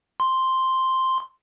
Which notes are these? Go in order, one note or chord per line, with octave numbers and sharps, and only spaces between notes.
C6